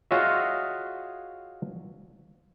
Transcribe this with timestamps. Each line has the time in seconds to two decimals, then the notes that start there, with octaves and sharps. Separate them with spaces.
0.11 F4 F#4 G#4 C#5 D#5 E5